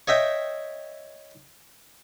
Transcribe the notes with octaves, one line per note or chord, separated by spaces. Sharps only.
C#5 D#5 E5 G5